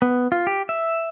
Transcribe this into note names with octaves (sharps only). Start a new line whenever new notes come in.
B3
F4
G4
E5